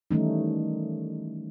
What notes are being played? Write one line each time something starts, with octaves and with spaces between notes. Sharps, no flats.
D#3 E3 G3 A3 C#4 D#4